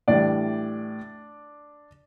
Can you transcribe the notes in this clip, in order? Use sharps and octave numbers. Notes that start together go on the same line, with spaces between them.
A2 E3 G3 D4 D5